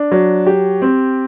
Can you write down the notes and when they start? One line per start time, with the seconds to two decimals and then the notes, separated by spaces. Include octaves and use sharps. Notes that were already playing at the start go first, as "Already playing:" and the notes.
Already playing: D4
0.12 F#3
0.46 G4
0.82 C4